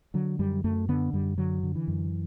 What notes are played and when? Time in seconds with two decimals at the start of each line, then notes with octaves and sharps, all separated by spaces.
0.14 D3 F#3
0.39 F#2 G3
0.64 F#2 A3
0.89 D3 B3
1.13 F#2 G3
1.38 D3 F#3
1.63 D3
1.75 E3
1.88 F#2